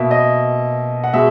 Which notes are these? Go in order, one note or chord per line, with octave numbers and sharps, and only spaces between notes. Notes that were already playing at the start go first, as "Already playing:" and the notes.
Already playing: B2 A#3 E5
D#5
F#5
B2 G#3 E5